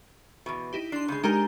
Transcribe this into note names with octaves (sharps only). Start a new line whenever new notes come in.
E2 B2
D#4 E4 G4
D4 C6 C7
C#3 G#3
G#3 D4 D#4 G4 A#4 G#5